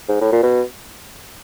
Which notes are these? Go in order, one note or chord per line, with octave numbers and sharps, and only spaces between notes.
G#2
A2
A#2
B2